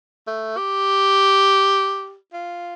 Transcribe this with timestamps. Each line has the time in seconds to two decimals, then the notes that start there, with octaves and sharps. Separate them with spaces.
0.27 A3
0.57 G4
2.33 F4